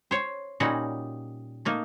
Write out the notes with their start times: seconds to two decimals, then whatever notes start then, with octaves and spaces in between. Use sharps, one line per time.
0.11 C5 C#5
0.60 A#2 G3 C#4 D#4 F#4 F#5
1.65 A3 A#3 D#4